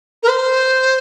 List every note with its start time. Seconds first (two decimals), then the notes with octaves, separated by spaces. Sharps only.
0.22 A#4
0.27 C5